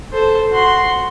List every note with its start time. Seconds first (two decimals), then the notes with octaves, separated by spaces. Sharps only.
0.12 A4 C5
0.52 F#4 C6